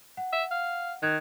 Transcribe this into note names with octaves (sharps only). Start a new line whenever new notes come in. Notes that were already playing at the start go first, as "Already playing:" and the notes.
F#5
E5
F5
D#3 F#6 G#6